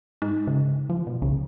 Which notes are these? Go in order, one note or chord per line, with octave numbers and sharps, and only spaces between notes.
G#2 D#4
C#3
F3
B2
C2 C#3